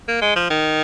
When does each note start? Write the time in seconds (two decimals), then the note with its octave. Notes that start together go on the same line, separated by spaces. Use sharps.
0.08 A#3
0.22 G#3
0.36 F3
0.50 D#3